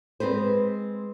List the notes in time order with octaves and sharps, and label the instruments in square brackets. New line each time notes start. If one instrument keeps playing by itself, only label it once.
[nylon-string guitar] G#3 C4 B4 C5